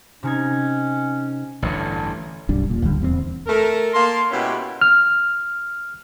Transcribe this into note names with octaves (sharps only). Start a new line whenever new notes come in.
C3 C#4 D#4 G#6
A1 G2 D3
F#1 B1 G3 D4
E1 A#2
D1 C#2 D3 G3
D1 E2 B3 C4
A3 A4 A#4
A#3 A5 C6
B2 G#3 C#4 E4 G4
F6